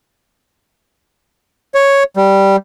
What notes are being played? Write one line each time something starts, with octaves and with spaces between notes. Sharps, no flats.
C#5
G3